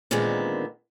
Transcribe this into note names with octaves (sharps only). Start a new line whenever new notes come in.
A#2 D3 D#3 G#3 B3 C4